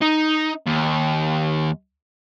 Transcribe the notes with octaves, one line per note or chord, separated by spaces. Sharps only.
D#4
D#2